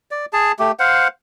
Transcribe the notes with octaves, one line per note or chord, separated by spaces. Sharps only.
D5
G#4 A5
A3 G4
C5 F5 F#5